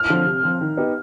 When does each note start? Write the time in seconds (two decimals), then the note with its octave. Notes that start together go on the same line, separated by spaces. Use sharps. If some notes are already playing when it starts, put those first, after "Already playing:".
Already playing: F6
0.09 D3 F3 C4
0.26 C3
0.43 F3 C4
0.61 D#3
0.77 B3 D#4 G4